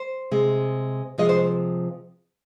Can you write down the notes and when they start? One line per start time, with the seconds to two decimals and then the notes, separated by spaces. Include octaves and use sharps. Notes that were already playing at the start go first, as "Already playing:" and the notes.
Already playing: C5
0.31 C3 G#3
1.18 C3 F3 G#3 D#5
1.29 C5